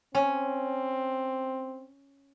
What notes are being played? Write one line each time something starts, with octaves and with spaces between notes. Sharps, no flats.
C4 C#4